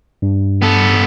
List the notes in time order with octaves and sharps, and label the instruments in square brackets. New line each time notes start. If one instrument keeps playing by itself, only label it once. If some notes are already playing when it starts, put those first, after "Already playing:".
[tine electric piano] G2
[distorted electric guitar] B3 A4